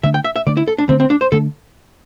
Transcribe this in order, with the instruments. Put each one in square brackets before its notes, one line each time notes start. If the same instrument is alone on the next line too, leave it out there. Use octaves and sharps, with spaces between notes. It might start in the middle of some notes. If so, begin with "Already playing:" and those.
[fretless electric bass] D3 A3 D4 [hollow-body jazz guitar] E5
[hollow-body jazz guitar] G5
E5
E5
[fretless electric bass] D3 A3 D4 [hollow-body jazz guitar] D5
[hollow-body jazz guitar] E4
A4
D4
[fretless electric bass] D3 A3 D4 [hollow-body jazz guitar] C4
[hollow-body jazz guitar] C4
D4
C5
[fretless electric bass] D3 A3 D4 [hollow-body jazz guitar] A4